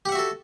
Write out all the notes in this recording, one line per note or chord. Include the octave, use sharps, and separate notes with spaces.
F#4 G4 A4 E5 F#5